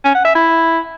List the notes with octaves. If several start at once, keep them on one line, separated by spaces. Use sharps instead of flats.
C#4
F#5
E5
E4